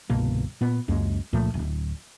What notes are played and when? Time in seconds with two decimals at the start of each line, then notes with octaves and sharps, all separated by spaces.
0.10 G1 C2 B2 A#3
0.61 A#2 B3
0.88 C#2 F#2 G#3 A#3
1.33 C#2 A#2 F3 A3
1.54 D1